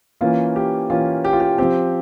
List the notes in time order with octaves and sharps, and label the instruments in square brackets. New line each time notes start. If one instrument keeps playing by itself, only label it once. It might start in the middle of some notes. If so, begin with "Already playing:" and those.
[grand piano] E3 A#3 C#4 F4
G4
E3 A#3 C#4 F4
G4
F4
G4
F3 C4 G4